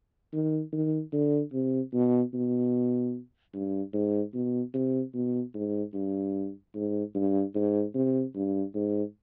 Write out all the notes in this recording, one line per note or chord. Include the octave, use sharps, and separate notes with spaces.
D#3
D#3
D3
C3
B2
B2
G2
G#2
B2
C3
B2
G#2
G2
G#2
G2
G#2
C3
G2
G#2